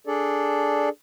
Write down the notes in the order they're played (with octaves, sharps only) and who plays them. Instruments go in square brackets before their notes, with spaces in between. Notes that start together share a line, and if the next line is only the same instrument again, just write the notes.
[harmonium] D4 G#4 A4 D5